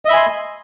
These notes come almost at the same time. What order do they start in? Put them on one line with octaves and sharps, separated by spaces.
D#5 E5 B5 G#5 C6